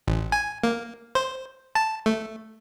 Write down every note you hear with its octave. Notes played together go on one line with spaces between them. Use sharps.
A1
G#5
A#3
C5
A5
A3